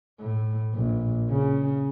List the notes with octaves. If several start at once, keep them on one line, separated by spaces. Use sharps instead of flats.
A2
A#1
C#3